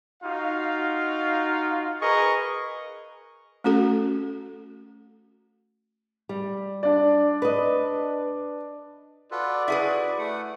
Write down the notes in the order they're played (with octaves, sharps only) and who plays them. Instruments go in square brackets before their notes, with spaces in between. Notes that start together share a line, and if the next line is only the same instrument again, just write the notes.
[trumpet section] D#4 F4 F#4 F5
G#4 A#4 B4 D#5 C#6
[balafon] A3 C#4 F#4 A4
[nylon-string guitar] G3
[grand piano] D4 D5
[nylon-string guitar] B4 D#5
[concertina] F4 A4 B4 [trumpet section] F#4 D5
[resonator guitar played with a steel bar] E4 G#4 B4 [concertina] C#6
[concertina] A3 F#5